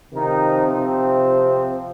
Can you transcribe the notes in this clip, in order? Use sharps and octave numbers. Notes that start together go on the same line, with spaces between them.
C3 D#3 F3 D#4
C3 C4